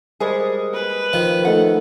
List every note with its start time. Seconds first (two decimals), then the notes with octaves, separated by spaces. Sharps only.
0.20 G3 G#3 G#4 A#4 C5 D#5
0.74 B4
1.13 D#3 F3
1.45 A3 D#4 A4 B4 F#5